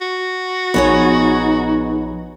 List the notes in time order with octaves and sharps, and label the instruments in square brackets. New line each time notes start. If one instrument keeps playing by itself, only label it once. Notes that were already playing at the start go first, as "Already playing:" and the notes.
[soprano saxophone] F#4
[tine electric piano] A#1 F3 B5 [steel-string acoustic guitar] B3 G#4 C#5 [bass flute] D#4